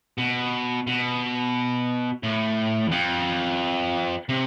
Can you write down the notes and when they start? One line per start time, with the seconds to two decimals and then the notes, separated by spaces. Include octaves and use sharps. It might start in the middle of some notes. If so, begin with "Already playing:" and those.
0.18 B2
0.87 B2
2.23 A2
2.87 E2
2.91 F2
4.29 C3